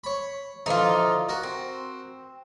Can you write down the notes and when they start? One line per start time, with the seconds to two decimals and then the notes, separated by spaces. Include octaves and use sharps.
0.04 C#5 B5
0.66 D3 E3 F3 D#4 F4
1.29 F#4 A#4
1.43 C4